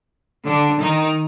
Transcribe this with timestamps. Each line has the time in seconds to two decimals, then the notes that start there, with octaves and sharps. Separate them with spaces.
0.45 D3 D4
0.80 D#3 D#4